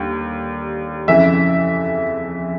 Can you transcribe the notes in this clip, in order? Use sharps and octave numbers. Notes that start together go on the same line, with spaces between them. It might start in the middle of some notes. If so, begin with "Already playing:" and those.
Already playing: D#2 D3 G3
F2 C#3 E3 E5